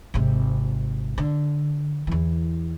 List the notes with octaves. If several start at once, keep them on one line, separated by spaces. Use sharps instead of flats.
G#1 C3
D3
E2 E3